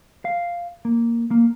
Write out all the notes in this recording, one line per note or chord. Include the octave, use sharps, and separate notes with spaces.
F5
A#3
A#3